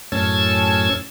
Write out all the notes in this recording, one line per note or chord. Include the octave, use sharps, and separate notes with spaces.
F#2 A2 C#4 A5 E6 G#6